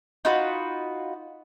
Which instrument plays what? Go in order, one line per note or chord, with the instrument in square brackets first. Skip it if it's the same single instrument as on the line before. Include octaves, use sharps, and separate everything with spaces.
[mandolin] D#4 F4 F#4 B4